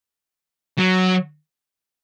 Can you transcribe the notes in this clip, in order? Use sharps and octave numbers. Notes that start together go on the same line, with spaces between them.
F#3